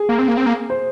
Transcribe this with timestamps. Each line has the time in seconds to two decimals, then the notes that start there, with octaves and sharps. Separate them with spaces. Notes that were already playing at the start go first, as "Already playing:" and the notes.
Already playing: G#4
0.09 A#3
0.19 C4
0.28 A#3
0.37 C4
0.46 A#3
0.70 C5